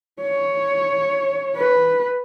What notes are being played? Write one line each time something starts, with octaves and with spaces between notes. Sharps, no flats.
C#5
B4